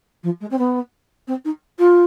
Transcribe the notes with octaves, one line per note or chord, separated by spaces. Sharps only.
F3
G#3
C4
B3
C4
D#4
F4